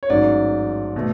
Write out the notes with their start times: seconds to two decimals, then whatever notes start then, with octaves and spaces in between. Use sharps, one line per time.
0.03 C#5
0.10 A1 G#2 F#3 D5
0.96 B2 A3